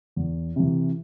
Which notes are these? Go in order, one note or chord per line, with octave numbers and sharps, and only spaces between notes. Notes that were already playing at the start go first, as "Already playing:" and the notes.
E2
C3 E3